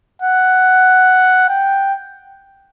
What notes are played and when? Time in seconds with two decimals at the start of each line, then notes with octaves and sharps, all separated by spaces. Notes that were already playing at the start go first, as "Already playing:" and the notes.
0.22 F#5
1.49 G5